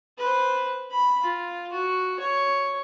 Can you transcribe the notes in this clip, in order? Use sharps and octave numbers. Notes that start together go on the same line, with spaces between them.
B4 C5
B5
F4
F#4
C#5